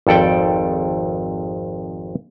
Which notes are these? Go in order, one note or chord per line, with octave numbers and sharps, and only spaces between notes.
G#1 F2 A4 D5 G5